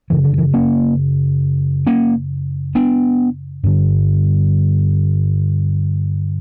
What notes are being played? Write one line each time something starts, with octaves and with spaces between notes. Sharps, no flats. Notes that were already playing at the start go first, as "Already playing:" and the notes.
F#2 C#3 E3
D3
E3
A#3 C#4
A#3 C#4
B3 D4
G2 D3